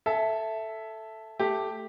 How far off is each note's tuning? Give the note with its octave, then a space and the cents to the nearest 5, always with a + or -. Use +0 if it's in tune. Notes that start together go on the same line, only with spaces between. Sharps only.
A4 +0 E5 +0 G#5 +35
A3 +0 G4 +0